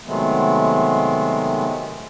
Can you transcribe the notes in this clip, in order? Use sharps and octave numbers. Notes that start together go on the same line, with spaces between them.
C3 D#3 F#3 G#3 A3 B3